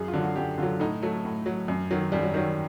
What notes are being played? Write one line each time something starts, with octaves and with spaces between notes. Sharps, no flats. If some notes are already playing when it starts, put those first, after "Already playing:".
Already playing: F#2 G#4
F4
D3 F#3
F#4
F#2 G4
D3 F#3 F4
A2 D#4
F#3 A3
A2
F#3
F#2
D#3 F#3
F#2 G3
F#3
D#3 F#3 G3